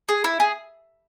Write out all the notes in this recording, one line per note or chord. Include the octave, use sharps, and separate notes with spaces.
G#4
E4
G#4